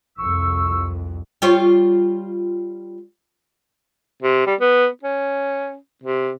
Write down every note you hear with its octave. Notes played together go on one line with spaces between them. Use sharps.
C2 F2 C#6 E6
G3 F4 C#5
C3
G3
B3
C#4
C3